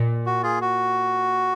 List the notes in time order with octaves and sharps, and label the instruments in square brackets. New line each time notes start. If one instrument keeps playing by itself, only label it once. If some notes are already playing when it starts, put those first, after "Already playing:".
Already playing: [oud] A#2
[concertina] F#4
F4 G#4
F#4